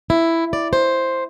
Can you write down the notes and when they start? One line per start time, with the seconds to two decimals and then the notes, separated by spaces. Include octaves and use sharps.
0.10 E4
0.53 D5
0.73 C5